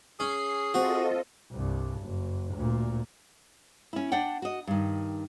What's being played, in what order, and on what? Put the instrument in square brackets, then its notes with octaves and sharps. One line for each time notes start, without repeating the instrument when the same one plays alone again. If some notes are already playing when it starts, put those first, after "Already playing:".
[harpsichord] C#4 [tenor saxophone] G#4 [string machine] C7
[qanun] C4 [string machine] F4 A4 D#5 [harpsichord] F#4
[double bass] C2 G2
F#1
D2 A#2
[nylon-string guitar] C#4 E4
D4 D5 F#5 G5
F#4 D#5
G2 D#3